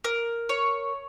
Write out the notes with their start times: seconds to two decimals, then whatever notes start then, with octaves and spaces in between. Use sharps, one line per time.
0.04 A#4
0.49 C#5